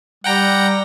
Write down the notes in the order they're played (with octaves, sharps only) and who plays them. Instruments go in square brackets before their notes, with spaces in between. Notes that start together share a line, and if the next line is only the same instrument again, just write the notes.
[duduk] G3 [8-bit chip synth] F#5 G5 A#5